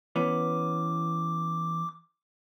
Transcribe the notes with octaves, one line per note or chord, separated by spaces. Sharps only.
E3 B3 C#4 D6